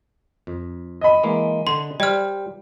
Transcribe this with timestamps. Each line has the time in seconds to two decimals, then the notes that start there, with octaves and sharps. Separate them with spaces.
0.47 F2
1.01 D#5 B5
1.23 E3 G#3 A#3
1.67 D3 C6
2.00 G3 C5 D5 F6